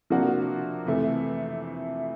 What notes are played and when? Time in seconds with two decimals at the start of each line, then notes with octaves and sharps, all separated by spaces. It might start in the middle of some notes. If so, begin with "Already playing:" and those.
0.10 C3 F3 A#3 D4 F#4
0.86 F2 C3 E3 A3